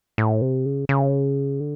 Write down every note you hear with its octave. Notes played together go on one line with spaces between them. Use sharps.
A2
C3
C#3
C#3
D3